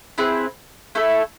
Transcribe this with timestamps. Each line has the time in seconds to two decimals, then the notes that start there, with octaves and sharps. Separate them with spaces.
0.18 C4 E4 G#4 B4
0.95 A3 E4 A4